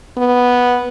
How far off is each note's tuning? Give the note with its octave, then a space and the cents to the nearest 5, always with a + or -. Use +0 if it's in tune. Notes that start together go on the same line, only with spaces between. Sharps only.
B3 -5